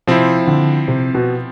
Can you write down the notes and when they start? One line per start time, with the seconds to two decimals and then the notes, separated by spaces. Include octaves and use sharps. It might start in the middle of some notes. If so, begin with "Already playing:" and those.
0.07 C3 F3 C4 E4
0.47 D3
0.88 C3
1.14 B2